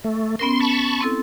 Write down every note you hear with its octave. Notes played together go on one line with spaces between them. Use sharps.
A3
B3 C#4 A#4 C6
A5 B5 C#6
C4 E4 A4